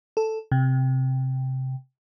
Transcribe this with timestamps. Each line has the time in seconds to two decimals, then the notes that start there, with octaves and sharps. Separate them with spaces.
0.17 A4
0.52 C3